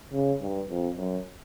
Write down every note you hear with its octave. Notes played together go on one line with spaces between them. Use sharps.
C#3
G2
F2
F#2